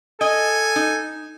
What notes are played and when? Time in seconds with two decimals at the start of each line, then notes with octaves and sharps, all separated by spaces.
0.21 A4 D#5 G#5
0.76 D#4